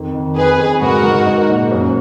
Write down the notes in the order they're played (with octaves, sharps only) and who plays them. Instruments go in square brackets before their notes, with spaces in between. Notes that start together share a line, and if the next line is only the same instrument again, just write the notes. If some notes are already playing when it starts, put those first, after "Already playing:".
Already playing: [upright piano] F2 D#3
D#3
[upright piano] F2 [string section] G#4 B4
[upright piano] F2
[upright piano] G#2 [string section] F#4 A#4
[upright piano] G#2
D#4
A#2
F#2